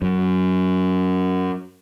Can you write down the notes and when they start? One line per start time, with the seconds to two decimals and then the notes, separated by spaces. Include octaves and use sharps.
0.02 F#2